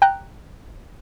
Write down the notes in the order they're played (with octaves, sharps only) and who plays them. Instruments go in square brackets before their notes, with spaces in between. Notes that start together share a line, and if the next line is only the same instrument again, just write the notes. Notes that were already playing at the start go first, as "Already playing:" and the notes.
[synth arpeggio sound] G5 A#5 F#6